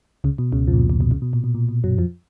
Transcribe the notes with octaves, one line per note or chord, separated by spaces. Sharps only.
C#2 C#3
B2
C#2 C#3
F2 F3
A#2
B2
A#2
B2
C#2 C#3
B2
A#2
B2
A#2
B2
F#2 F#3
F2 F3